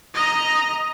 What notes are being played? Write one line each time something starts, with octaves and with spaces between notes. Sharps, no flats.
D#5 A#5